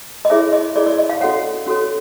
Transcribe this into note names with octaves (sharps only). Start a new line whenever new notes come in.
D#5
E4 G#4 C#5 E5
D#5
E4 G#4 C#5 D5
D5
D#5
F5
C#4 F#4 A4 C#5 F#5
C#4 F#4 A4 C#5